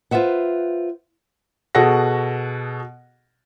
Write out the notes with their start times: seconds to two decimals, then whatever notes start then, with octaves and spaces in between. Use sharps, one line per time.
0.11 F4 B4 C5 E5 F#5
1.75 B2 F#4 G#4 A4 F#5 A#6